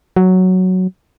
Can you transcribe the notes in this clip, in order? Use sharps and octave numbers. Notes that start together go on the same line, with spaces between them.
F#3